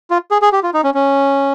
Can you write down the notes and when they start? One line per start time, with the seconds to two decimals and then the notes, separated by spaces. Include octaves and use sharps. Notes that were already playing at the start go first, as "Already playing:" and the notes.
0.11 F4
0.31 G#4
0.42 G#4
0.52 G4
0.63 F4
0.74 D#4
0.84 C#4
0.94 C#4